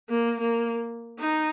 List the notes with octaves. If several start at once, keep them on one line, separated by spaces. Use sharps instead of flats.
A#3
A#3
D#4